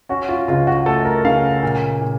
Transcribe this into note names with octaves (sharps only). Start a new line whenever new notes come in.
C#4 F#4
F4
C#2 F4
F#4
A3 A4
A#4
C#3 F5
A#2
A#2